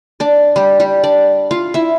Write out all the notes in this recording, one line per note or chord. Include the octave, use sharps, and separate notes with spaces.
D4 D5
G3 G4
G3 G4
D4 D5
F4 F5
E4 E5